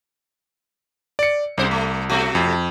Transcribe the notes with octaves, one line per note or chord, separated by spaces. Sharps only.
D5 C#7
C2 C3 C5
A3
B2 A3 F#4
F2